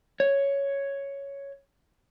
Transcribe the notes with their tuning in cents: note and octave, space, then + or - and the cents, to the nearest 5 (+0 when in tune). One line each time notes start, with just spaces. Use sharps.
C#5 +5